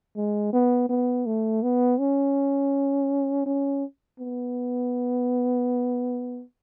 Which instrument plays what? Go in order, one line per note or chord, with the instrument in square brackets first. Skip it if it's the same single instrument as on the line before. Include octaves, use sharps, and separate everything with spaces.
[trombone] G#3
B3
B3
A3
B3
C#4
C#4
B3